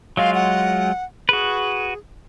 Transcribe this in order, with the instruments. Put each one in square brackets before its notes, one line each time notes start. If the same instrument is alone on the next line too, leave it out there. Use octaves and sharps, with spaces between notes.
[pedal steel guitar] F#3 G#3 F4 [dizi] F5
[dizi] F#5
[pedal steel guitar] F#4 B4 [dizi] G#4